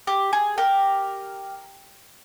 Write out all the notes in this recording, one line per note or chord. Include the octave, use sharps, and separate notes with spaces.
G4
G#4
G4 A#4